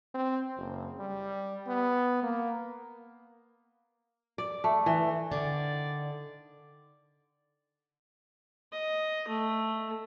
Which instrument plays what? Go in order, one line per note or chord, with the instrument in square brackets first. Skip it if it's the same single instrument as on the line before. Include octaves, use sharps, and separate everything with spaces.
[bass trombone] C4
F#1
G3
B3
A#3
[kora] D5
A3
E3
[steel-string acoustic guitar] D3 D#3 [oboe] D5
[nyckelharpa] D#5
A3